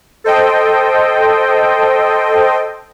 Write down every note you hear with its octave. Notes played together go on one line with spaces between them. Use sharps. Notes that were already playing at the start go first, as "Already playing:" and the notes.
A4 C5 D#5 G5